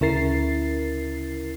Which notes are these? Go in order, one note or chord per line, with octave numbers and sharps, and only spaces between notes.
D2 C#3 E4 A#4 A6 C7